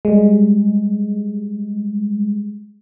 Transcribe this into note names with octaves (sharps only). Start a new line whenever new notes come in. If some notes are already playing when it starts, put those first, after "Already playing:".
G3 G#3